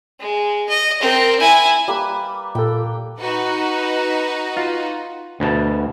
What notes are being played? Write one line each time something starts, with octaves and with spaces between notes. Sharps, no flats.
G#3
D#5
C4 A#4
E4 G#5
G3 A#3 B4
A#2 A4 G5
D#4 F#4 B4
F4
D2 B2 A5